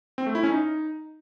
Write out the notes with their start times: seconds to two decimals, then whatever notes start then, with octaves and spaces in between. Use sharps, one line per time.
0.18 C4
0.26 A3
0.35 E4
0.43 C#4
0.52 D#4